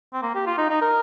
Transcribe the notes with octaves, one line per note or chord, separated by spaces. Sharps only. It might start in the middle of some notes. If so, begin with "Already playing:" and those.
C4
A#3
G4
F4
D#4
D#4
A#4